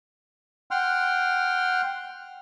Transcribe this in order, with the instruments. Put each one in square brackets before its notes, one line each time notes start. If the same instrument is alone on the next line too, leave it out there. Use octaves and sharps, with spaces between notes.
[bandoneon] F#5 G5 C6 F6